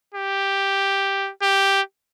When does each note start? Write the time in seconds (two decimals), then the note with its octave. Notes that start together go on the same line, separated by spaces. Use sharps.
0.14 G4
1.42 G4